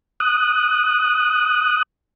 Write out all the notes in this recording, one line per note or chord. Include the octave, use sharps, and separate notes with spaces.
D#6 F#6